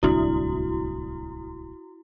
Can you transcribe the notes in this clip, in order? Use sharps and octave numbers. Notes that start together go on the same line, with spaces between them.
D1 C2 D4 E4 F#4